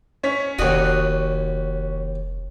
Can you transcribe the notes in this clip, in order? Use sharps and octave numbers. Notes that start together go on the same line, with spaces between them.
C#4 C#5 B6
F1 D#2 F#4 D5 D#6